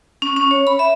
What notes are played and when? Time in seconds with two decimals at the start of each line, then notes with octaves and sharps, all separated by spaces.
0.22 C#4
0.36 C#4
0.51 C#5
0.67 B5
0.79 E5